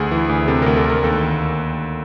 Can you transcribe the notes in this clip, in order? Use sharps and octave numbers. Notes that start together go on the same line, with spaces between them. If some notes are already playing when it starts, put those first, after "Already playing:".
Already playing: D2 G#4
E3
D2
C3 A4
A#4
D2
A4
D2 A#4
D#2 A4
D#2